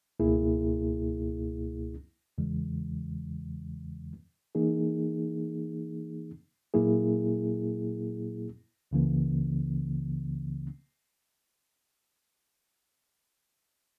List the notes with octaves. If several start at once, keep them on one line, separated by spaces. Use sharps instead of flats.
C#2 B2 A#3 E4 G#4
E2 C#3 E3 G#3
E3 A#3 D#4 G#4
A#2 F#3 A#3 E4 G#4
C#2 C#3 E3 A#3